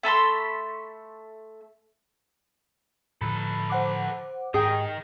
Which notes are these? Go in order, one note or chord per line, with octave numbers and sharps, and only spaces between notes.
A3 A4 B5 C6
A2 D3 F3 A4 B4 B5
C5 F#5 D6
G#2 D#3 G#4 D#5 G5 G#5